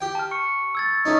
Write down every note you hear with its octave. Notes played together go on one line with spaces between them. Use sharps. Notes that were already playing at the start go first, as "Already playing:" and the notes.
G4 G5
A5 F6
C#6 C#7
E6 G#6 A6
A3 C#4 D#4